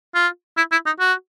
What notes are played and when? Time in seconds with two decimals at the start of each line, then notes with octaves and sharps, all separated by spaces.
0.15 F4
0.57 E4
0.72 E4
0.86 D#4
1.00 F#4